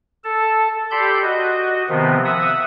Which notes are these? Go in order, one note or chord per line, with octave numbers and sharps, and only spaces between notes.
A4 A5
G4 A4 D5 B5 C6 G6
F#4 D#5
C3 D#3 F3 B3 C4
E5 F#5 D#6